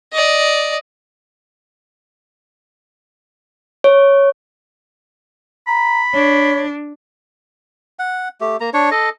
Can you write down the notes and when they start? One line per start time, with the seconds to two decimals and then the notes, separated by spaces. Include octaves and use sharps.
0.13 D5 D#5
3.84 C#5
5.68 A#5 B5
6.13 D4 C#5
7.99 F#5
8.41 A3 G4
8.60 A#3 A#5
8.74 D4 C#5
8.91 A4 D#5